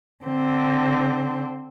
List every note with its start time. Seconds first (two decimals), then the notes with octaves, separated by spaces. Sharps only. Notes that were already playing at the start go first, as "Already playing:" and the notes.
0.25 D3 C4